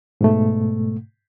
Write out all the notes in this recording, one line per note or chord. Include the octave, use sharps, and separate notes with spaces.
G#2 B2 A3